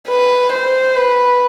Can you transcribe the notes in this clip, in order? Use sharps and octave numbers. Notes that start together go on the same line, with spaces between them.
B4
C5
B4